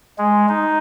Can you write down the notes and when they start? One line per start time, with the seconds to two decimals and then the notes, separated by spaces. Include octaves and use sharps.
0.18 G#3
0.49 D#4